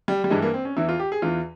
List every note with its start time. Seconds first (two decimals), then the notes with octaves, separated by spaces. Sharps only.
0.08 G3
0.24 G3
0.30 G2 E3 G#3
0.42 A#3
0.54 C4
0.65 C#4
0.77 E2 E3 E4
0.89 F4
0.99 G4
1.12 G#4
1.22 E2 E3 F4